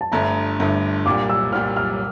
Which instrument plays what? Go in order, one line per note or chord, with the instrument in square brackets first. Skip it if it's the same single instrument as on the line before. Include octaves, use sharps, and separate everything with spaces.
[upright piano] A5
[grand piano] G1 G2 D3 A3 [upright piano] A#5
[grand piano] G1 G2 D3 A3
[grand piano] C2 A#2 G3 [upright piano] D6
[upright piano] E6
[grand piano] C2 A#2 G3 [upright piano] F6
[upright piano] F6